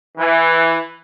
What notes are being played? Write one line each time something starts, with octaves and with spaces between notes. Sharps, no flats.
E3